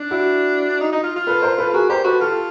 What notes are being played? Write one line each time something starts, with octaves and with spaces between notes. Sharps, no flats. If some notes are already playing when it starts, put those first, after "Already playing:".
Already playing: D4
E4 F#4
D#4
D#4
F4
F4
A4 B4
A#4 C5
A4 B4
F#4 G#4 A#4
G4 A#4 C5
F#4 A4 B4
F4 G4 A4